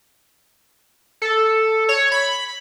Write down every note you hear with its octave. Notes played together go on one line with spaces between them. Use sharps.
A4
C#5
B5